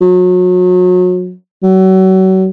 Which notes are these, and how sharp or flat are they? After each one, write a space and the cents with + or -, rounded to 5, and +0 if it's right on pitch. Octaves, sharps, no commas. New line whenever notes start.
F#3 -35
F#3 +35